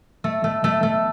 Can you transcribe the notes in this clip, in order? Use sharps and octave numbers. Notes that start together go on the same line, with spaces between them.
A3
A3
A3
A3